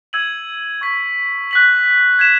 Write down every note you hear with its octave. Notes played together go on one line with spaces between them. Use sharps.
E6 G#6 D#7 F#7
C#6 G#6 B6
F#6 B6 F#7
G#6 B6 E7